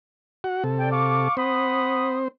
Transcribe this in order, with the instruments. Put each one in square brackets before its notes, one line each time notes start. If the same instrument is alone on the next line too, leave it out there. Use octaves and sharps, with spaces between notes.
[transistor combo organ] F#4 F#5
C3 A4
[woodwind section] D5 G5
F5 C#6 D6
[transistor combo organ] C4 C5 [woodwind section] F#5 B5 D#6